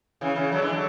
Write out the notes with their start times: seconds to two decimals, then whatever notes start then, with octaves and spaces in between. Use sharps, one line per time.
0.21 C#3 E3
0.36 C#3 E3
0.52 D3 F#3
0.62 E3 G#3
0.72 D3 F#3